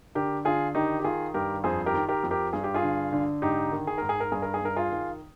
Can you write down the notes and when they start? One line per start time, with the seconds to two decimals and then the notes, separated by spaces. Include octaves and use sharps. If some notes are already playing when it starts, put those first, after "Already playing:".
0.15 D3 G4 A#4
0.45 D3 F4 G#4
0.75 D#3 D#4 G4
0.99 G4
1.04 D#3 F4 G#4
1.34 G2 G4 A#4
1.64 F2 G#4 C5
1.86 G4 A#4
1.94 D#3
2.09 G4 A#4
2.23 F2
2.31 G4 A#4
2.53 G2 G#4
2.64 G4
2.74 F4 G#4
2.83 D3
3.13 D3
3.42 G#2 D#4 G4
3.72 D#3
3.87 G#4
3.98 G#2 A#4
4.09 G#4
4.20 A#4
4.32 G2 G#4
4.42 A#4
4.54 G#4
4.61 G2 A#4
4.76 F4 G#4
4.91 D#3